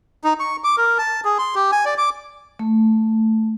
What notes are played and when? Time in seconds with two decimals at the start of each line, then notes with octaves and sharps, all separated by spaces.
0.24 D#4
0.40 C#6
0.64 D6
0.77 A#4
0.98 A5
1.25 G#4
1.38 C6
1.55 G4
1.72 G#5
1.85 D5
1.98 D6
2.59 A3